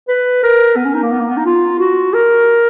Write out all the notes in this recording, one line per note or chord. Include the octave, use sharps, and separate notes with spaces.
B4
A#4
B3
C#4
D#4
A#3
B3
A#3
B3
D#4
F4
F#4
A#4